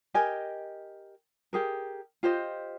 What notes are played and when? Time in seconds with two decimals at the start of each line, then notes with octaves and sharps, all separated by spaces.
0.14 G4 A#4 D#5 G#5
1.53 G4 G#4 A#4
2.23 F4 G4 C5 D#5